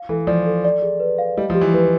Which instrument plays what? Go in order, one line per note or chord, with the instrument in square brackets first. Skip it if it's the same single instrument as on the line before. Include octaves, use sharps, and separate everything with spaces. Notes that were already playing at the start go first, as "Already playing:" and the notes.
Already playing: [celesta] F5
[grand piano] E3 [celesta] A4
[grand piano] F3 [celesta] D5
[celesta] A4
D5
G#4
B4
F5
[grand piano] G3 [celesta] D#5
[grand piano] F3
[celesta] G4
[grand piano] E3
[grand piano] F3 [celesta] B4